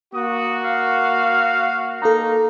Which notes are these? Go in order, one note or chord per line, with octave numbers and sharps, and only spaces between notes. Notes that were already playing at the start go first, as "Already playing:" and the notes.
A#3 F#4 D#6
F5
A#3 D#4 A4 A#5